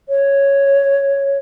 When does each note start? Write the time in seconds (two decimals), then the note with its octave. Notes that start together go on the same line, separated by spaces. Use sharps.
0.09 C#5